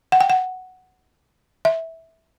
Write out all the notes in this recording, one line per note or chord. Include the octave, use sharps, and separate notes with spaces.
F#5
G5
F#5
E5